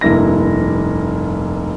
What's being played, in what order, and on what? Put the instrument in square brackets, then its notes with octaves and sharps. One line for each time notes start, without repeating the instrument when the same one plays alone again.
[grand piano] F1 G2 A#3 E4 A#6